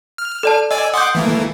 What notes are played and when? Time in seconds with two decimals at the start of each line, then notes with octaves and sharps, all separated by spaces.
0.18 F6
0.43 A4 D5 A5
0.71 D5 D#5 G#5 E6
0.94 F#5 C6 D6 D#6 G6
1.15 E3 A3 A#3